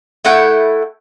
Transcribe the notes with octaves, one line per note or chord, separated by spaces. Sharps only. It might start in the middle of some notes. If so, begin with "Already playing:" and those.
A3 E4 F#5 G5